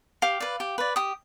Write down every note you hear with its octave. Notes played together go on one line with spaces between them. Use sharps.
G4 F5
B4 D5
G4
B4 D5
G4 D#6